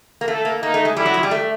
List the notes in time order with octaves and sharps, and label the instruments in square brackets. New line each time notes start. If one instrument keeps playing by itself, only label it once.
[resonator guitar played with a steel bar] A#3
[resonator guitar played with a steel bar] A3 [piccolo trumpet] A4
[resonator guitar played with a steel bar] A#3
[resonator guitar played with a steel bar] A#3 [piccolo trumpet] D#4
[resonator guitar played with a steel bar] A3
G#3
[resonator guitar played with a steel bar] G3 [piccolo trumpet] E4
[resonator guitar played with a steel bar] F#3
F3
G3
A3